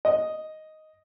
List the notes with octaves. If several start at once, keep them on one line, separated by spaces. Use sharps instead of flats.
D#5